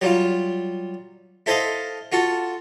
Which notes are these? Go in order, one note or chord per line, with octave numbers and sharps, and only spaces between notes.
F#3 G3 F4
E4 A4 C5 D#5 F5
F4 F#4 A4